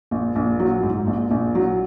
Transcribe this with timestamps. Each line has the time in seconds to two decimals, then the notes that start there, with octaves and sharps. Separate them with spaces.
0.11 A#1
0.35 A#1
0.59 F#3
0.83 G#2
1.07 A#1
1.31 A#1
1.55 F#3